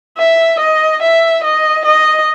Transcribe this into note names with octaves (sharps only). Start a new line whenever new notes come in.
E5
D#5
E5
D#5
D#5